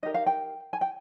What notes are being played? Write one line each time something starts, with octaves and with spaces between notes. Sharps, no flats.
D#4 G4 A#4 D#5
F5
G5
G#5
G5